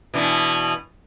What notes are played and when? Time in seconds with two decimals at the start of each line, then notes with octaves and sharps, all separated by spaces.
0.14 B2 E3 D4